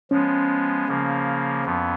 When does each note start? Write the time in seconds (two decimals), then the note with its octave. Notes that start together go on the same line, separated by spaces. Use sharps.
0.11 F3 G#3 B3 C#4
0.88 C#3 F3 A#3
1.65 F2 F3 B3